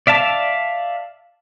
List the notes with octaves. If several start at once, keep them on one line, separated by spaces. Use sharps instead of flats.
D5 E5 F5 A5